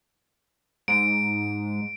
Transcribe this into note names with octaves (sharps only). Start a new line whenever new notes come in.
G#2 D7